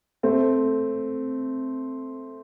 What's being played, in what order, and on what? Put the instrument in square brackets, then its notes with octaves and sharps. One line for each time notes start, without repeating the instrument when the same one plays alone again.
[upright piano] A3 C4